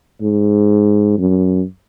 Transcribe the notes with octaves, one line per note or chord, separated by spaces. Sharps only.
G#2
F#2